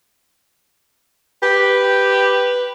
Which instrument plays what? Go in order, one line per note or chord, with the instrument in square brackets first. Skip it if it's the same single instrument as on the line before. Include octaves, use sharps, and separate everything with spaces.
[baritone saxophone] G4 [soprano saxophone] B4